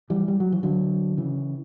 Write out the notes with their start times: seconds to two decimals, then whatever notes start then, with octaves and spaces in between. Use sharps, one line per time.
0.10 E3 G3
0.28 G3
0.40 F#3
0.52 E3
0.63 D3 F#3
1.18 C#3 E3